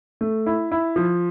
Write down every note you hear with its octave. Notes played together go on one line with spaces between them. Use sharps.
A3
E4
E4
F3